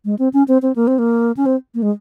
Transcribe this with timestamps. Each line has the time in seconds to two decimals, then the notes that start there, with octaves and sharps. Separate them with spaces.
0.05 G#3
0.19 C4
0.33 C#4
0.48 C4
0.62 C4
0.76 A#3
0.87 C4
0.99 A#3
1.37 C#4
1.46 C4
1.75 A#3
1.82 G#3